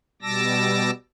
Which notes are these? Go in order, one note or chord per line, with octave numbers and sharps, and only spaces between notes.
B2 G3 A5 D6 E6 A#6